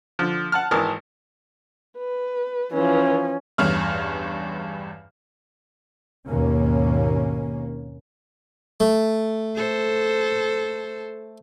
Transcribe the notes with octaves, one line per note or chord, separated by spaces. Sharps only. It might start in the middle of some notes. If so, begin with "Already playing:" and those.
D3 F3
F#5 A5 F6
G#1 E3 A#4 A5 D#6 F6
B4
E3 F3 C#4
A1 E2 G2 C#5 F6
G#1 D#2 B2 A#3 C#4
A3
A4 C5